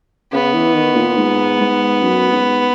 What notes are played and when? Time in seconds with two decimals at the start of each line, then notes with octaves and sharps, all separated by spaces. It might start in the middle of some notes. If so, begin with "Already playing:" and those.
0.32 C#3 B3
0.54 E3
0.74 D#3
0.96 A#2
1.17 G#2
1.60 G#2
2.03 F#2
2.31 G#2